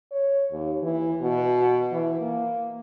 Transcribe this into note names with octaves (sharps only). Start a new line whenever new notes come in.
C#5
D#2
E3
B2
E3
A#3